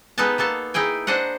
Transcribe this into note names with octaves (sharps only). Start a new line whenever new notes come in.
G#3 B3 D#4 A4 B4 A5
A#3 B3 A4 A5
D#4 E4 G#4 G5 G#5
D4 C5 D#5 F#5